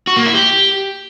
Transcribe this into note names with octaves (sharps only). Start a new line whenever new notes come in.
F#4
A#3
E4
G4